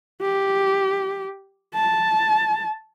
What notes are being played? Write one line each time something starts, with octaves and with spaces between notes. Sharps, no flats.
G4
A5